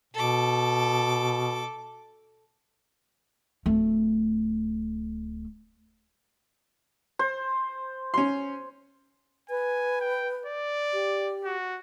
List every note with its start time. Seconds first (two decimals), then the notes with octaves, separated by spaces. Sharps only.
0.14 B2 A4 D6
3.66 D1 A3
7.19 C5
8.14 C#4 C6
9.50 B4 G#5
10.01 G5
10.46 D5
10.93 G4
11.44 F#4